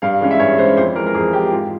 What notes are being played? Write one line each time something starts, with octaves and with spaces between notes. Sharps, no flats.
G2 F5
E3 G#3 C#4
E5
G2 C#5
E3 G#3 C#4 C5
F2 C5
E3 G#3 A#4
A#4
F2 G#4
E3 G#3 G4
G#2 F4